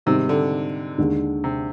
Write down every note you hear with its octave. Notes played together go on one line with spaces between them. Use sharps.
G#2 C3 D#3 G3 C4
D3
D#2 D3 G#3
C3